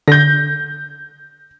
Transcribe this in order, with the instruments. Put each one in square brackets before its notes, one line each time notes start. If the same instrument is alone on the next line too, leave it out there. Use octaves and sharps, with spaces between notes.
[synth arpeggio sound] D3 [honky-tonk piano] G6 A#6